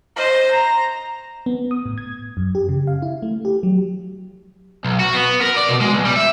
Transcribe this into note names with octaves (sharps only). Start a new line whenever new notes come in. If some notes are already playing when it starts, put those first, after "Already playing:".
C5 D#5
A#5
B3
D#6
A2
G#6
F#2
G4
C#3
F5
E4
A3
G4
F#3
B1
F#4
B3
A#4
D5
B2
G#3
B1
G3
E5